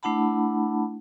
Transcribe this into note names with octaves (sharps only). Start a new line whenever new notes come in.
A3 D4 E4 F#5 A5 B5